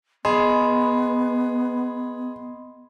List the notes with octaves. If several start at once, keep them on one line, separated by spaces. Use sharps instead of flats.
B3 G#4 D#5 B5 C6